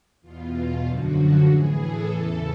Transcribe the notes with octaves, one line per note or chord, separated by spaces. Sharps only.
E2 B2 F4
F#2 D3 F3 F#4
A2 E3 G#4
A4
E2 C#3 E3